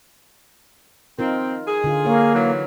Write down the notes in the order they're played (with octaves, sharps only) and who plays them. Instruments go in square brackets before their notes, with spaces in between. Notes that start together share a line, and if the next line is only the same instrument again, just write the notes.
[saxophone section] C4 [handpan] D#4 F4 A#4
[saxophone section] G#4
[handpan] D3 F4
[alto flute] A#3 [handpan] A#4 C#5 F5
[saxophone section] E3 F#3